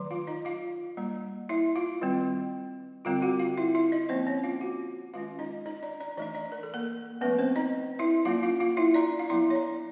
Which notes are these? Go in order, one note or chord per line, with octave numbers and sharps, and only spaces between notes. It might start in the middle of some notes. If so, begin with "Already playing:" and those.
Already playing: D#3 F#3 A3 D4
F4 F5
D#4 D#5
F4 F5
G3 A#3 D4
E4 E5
F4 F5
D#3 G3 C4
D3 G3 C4 F4 F5
F#4 F#5
F4 F5
E4 E5
E4 E5
D#4 D#5
F3 A#3 C4 C#4 C5
C#4 C#5
F4 F5
F#4 F#5
D#3 G#3 C#4 F4 F5
D#4 D#5
D#4 D#5
D4 D5
D4 D5
E3 A3 D4 D#4 D#5
D4 D5
A#4
A4
A#3 A#4
F3 A3 B3 C#4 B4
C4 C5
D#4 D#5
E4 E5
F#3 A#3 C#4 F4 F5
F4 F5
F4 F5
E4 E5
D4 D5
F5
F#3 B3 D4 E4 E5
C#5
D4 D5